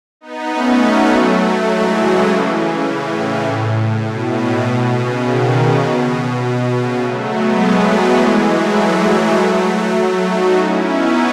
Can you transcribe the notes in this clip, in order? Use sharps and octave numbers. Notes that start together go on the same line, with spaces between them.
B3 D#4
A3 C#4
F#3 A3
E3 G#3
C#3 E3
A2
B2
A2
B2
C#3
B2 D#3
C#3
B2
B2
B2
C#3
F#3 A3
G#3 B3
F#3 A3
E3 G#3
E3 G#3
F#3 A3
F#3 A3
D#4 F#4
C#4 E4
B3 D#4